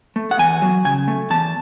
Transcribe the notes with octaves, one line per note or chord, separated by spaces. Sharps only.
A3
F#5
E2 G#5
F#3
C#3 G#5
A3
E2 A5